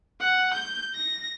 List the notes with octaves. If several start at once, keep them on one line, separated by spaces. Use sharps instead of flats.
F#5
G6
A#6